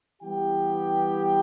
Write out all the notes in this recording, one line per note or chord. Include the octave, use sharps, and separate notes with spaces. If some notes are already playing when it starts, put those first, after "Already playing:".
E3 G3 B3 G4 G5